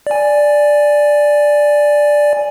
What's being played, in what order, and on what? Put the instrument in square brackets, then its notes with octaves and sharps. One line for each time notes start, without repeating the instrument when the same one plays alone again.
[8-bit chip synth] D5 G#5